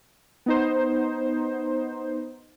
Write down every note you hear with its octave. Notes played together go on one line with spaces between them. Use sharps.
B3 D#4 C5